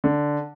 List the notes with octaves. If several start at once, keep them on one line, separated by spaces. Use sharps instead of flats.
D3